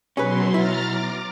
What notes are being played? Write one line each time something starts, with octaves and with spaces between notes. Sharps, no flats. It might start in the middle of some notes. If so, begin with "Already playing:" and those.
B2 F#3 C#4 G#4 B4 C6
E4 A#5 F6 A6
D6